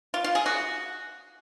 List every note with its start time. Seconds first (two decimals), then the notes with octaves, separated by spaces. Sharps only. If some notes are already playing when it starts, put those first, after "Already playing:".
0.14 F4
0.24 F4
0.35 G#4
0.46 F#4